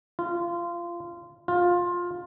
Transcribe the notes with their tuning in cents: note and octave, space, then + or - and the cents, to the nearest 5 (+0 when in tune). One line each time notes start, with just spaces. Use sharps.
F4 -20
F4 +15